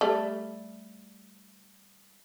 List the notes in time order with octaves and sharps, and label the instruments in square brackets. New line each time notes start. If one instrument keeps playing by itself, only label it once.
[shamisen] G3 A3